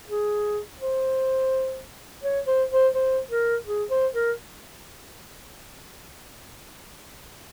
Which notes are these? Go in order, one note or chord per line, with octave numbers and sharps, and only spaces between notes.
G#4
C5
C#5
C5
C5
C5
A#4
G#4
C5
A#4